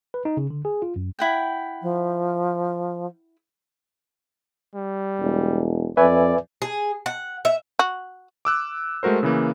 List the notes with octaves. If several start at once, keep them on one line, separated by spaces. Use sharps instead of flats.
B4
D#4
C#3
D3
G#4
F4
F#2
E4 F#5 G5
F3
G3
E1
F2 B4 D5 E5 G#5
G#4
F#5
E5
F#4
D6 E6 F#6
G#3 A3 F#4 A#4 C5
C#3 E3 A#3